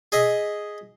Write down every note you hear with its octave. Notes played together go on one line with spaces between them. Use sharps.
G#4 D#5 E5